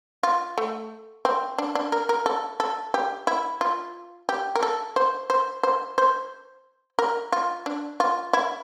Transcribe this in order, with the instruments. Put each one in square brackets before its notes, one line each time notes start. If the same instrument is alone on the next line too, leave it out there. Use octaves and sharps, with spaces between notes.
[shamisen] F4
A3
C4
D4
D4
A#4
A#4
A4
A4
G4
E4
F4
G4
A#4
A4
C5
C5
C5
C5
A#4
F4
D4
F4
E4